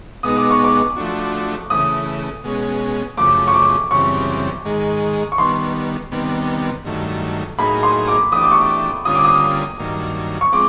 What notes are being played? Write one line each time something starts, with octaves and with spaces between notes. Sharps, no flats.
B2 G#3 B3 D#4 D#6
D6
C#6
D6
F3 A3 D4 F#4
C#3 E3 A3 D#6
B2 G#3 C#4
F#2 C#3 F3 A3 D6
C#6
D6
F#2 C#3 E3 G3 C4 C#6
G#2 D#3 G#3
C#6
D#3 G3 B3 C6
C3 D#3 G3 B3
G2 D#3 F#3 A3
A2 F#3 A#3 D#4 G#4 B5
C6
D6
E3 A3 D4 G4 D#6
D6
C#6
D6
D3 G3 A#3 C#4 F4 D#6
D6
D#6
G2 D#3 F#3 A#3
C#6
F3 G#3 C4 D6